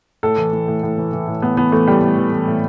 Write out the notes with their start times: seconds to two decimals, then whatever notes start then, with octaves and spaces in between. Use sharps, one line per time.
0.23 A2 A4
0.38 E3
0.53 E3
0.68 A2
0.83 A2
0.98 E3
1.13 E3
1.27 A2
1.42 A2 B3
1.57 E3 B3
1.72 E3 A3
1.87 A2 G3
2.02 A2
2.18 E3
2.32 E3
2.47 A2